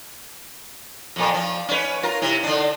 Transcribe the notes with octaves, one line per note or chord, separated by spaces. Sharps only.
F2 A#2
F3
C#4 B4
F4 A#4
C3 E4
D3 D4